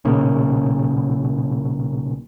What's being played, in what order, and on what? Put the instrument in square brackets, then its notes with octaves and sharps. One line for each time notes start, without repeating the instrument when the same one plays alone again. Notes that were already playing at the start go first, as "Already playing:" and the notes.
[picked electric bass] B1 A#2 C#3